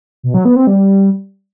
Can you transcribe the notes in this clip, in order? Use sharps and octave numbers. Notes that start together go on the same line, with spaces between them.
B2
F#3
B3
C4
G3